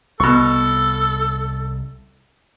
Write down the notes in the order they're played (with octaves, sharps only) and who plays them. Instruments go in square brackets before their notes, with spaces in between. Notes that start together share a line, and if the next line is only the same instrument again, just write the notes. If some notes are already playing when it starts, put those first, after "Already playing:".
[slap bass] C2 [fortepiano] B2 C#6 [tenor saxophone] A4